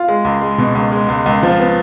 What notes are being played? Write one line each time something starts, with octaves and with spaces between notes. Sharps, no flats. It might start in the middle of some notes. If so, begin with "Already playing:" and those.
Already playing: F4
G#3
C#2
G#3
B2
C#2
G#3
C#2
C#2
F3
B3